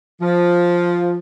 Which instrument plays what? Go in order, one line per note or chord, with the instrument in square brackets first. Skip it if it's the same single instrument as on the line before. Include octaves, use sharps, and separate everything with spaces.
[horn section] F3